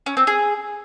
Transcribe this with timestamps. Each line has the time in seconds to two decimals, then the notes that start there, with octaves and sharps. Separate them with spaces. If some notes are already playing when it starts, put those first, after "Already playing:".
0.06 C#4
0.17 C4
0.27 G#4